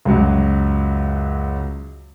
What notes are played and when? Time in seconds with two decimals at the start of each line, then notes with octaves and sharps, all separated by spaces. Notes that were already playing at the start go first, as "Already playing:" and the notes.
0.05 C#2 F#2 F#3